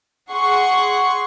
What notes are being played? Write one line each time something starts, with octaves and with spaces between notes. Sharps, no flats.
G#4 F#5 C6 C#6